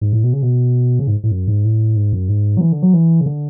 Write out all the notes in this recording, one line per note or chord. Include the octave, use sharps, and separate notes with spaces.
G#2
A2
B2
C#3
B2
C#3
G#2
A2
F#2
G#2
A2
G#2
F#2
G#2
F#3
E3
D3
F#3
E3
C#3
D3